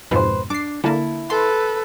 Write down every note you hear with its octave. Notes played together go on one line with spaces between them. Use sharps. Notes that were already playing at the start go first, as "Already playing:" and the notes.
F2 G#2 B2 B4 C5
D4 D6 C7
D3 A#3 E4 A5
A4 B4 C6